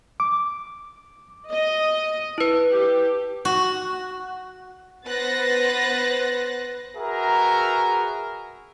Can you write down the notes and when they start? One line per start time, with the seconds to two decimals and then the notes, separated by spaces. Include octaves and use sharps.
0.20 D6
1.51 D#5
2.38 E4 B4
2.71 G4
3.45 F#4
5.06 B3 B4 C5 F#6 A6 A#6
6.96 F#4 G#4 A#4 B4 E5 A#5